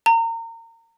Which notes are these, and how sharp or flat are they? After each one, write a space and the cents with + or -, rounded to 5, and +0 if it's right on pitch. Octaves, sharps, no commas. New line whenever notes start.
A#5 -30